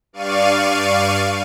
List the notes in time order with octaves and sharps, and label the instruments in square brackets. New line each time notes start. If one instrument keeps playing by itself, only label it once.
[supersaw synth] G2 D5 F5 C#6 D#7